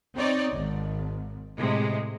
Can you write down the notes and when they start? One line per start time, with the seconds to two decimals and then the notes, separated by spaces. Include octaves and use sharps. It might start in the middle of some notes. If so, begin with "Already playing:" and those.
0.16 C4 D#4 C#5 D5
0.53 G#1
1.58 A2 C3 G#3